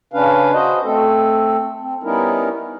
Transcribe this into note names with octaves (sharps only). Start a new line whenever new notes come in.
C#3 C#4 D4 B4 F5
F#4 C5 D#5
A3 C4 A4
C4
G3 B3 C#4 D#4 E4 A#4